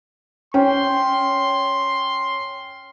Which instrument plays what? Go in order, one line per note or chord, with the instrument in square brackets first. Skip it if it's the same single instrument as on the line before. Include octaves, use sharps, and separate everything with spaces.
[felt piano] C#4 [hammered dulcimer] G5 [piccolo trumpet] C6